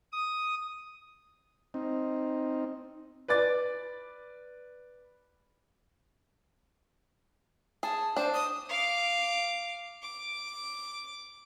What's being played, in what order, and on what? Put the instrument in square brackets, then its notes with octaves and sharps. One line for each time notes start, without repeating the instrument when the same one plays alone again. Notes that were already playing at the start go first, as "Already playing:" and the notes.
[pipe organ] D#6
[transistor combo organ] C4 D#4
[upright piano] B4 D5 D6 A6
[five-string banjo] G#4 [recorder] A5
[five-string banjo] D4 [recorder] C5
[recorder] D#6
[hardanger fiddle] F5 D6
D6